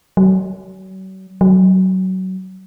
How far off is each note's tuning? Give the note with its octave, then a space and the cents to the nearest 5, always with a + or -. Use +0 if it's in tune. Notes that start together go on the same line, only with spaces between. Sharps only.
F#3 +40
F#3 +20